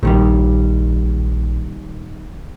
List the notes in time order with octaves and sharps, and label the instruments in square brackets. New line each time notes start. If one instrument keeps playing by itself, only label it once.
[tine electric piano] A#1 [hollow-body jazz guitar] A#2 D#3 G3